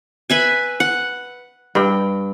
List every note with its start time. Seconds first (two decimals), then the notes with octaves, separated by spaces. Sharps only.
0.30 B4 E5 G#5
0.80 F#5
1.75 G2 G5